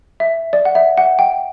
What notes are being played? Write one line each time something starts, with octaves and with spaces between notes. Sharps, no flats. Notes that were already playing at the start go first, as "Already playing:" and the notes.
E5
D5
F#5
E5
F#5
G5